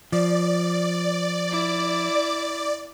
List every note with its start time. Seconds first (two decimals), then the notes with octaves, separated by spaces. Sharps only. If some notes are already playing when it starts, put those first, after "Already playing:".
0.12 F3 D5
1.51 E4 D6